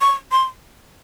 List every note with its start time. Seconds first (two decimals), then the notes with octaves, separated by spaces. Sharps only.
0.01 C#6
0.32 C6